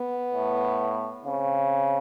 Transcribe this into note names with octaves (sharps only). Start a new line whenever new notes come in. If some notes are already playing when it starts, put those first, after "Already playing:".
Already playing: B3
A2
C#3 C4